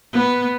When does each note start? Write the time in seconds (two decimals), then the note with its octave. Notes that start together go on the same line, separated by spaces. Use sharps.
0.13 B3